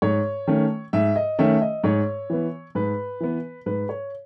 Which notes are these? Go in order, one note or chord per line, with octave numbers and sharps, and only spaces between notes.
G#2 C#5
D#3 A3 C#4
G#2 E5
D#5
D#3 A3 C#4 E5
D#5
G#2 C#5
E3 B3
G#2 B4
E3 B3
G#2 B4
C#5